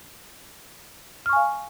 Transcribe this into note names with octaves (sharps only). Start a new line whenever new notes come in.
F5 G#5 C#6 F6